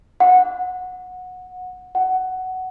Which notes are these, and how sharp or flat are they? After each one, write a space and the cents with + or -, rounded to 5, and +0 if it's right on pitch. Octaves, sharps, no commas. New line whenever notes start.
F#5 -15
F#5 +10